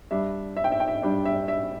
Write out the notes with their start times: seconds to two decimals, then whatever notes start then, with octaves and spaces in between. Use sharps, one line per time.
0.11 G2 G3 D4 E5
0.57 E5
0.64 G5
0.72 E5
0.80 G5
0.88 E5
1.02 G2 G3 D4
1.25 E5
1.48 E5